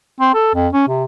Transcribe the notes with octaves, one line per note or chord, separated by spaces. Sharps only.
C4
A4
F2
C#4
C3